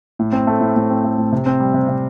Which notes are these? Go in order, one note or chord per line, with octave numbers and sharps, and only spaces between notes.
A2
C4
A3
A2
A2
C4
A3
A2
C3
C4
G3
C3
C3